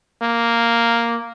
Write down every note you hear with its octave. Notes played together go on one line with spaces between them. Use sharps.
A#3